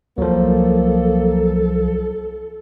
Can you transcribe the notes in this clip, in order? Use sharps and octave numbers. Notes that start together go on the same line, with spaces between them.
C2 F3 F#3 A#3 A4